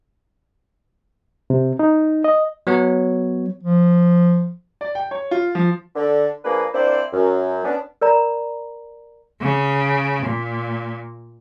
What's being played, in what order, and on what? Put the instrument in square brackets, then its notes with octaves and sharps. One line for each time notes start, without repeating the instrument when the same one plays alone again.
[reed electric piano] C3
D#4
D#5
[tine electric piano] F#3 B3 C#5
[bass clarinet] F3
[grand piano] D5
G5
C#5
F4
F3
[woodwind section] D3
F3 A#3 D4 G#4 B4
A#3 C4 D4 E4 C5 D5
F#2
B3 C#4 D4
[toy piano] A#4 D5 A#5 B5
[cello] C#3
A#2